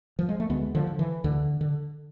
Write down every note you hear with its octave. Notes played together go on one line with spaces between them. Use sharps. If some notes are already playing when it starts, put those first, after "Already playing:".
F3
G#3
A3
D2 G#3 B3
D3 F3
D3
E3
D2 D3
D3